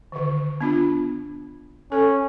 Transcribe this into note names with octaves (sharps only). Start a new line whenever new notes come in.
D3 D#3
B3 D4 F4
C#4 A4